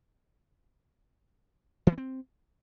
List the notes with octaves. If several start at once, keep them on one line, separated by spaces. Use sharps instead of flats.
E3
B3
C4